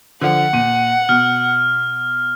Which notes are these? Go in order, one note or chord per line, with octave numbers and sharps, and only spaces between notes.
D3 F3 F#5
A#2 D#7
B2 F6